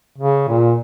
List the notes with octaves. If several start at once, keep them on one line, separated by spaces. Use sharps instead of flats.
C#3
A#2